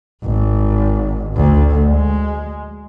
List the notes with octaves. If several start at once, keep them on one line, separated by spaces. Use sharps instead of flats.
G#1
D2
G#3